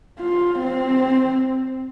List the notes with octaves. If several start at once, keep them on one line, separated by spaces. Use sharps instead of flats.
F4
C4